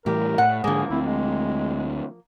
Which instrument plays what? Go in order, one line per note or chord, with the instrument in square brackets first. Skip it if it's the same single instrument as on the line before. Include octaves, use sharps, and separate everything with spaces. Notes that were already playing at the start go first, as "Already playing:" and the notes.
[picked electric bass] A2 E3 G3 [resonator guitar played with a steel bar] G4 [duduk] A#4
[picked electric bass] A2 [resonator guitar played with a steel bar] F#5
[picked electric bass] G#2 D3 [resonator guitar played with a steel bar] F3 A#3 [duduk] G#4
[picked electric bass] D2 C4 [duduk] E4
[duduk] G#3